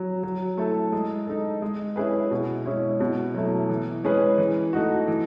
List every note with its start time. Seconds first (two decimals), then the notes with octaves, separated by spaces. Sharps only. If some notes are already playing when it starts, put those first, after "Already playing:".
Already playing: F#3
0.23 F#3
0.58 A3 E4 A4
0.92 G#3
1.27 D#4 A4
1.62 G#3
1.96 C#4 E4 G#4 B4
2.31 B2
2.65 G#3 C#4 E4
3.00 B2
3.34 F#3 A3 E4
3.70 E3
4.04 G#3 C#4 G#4 B4
4.38 E3
4.73 A3 D#4 F#4
5.08 E3